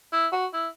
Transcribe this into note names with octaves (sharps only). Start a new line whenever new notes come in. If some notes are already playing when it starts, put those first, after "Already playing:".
E4
F#4
E4